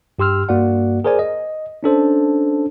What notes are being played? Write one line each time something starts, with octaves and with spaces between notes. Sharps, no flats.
G2 G4 C6 E6 F6
G2 A#3 F#4 D5 F#5
G#4 A#4 C5 D5 G#5
D#5
C#4 D4 A4 C5